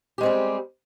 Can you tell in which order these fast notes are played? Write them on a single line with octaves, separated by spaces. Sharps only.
G4 G#3 C4 G3